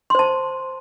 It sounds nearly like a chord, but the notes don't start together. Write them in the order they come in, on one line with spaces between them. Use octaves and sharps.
C6 C5 A5